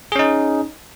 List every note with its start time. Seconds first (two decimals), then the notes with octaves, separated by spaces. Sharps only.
0.12 G#4
0.16 C#4
0.19 D#4